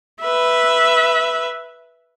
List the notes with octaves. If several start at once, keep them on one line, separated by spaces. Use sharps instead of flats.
B4 E5